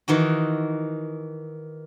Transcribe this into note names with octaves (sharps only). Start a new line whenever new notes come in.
D#3 E3 D#4 F#4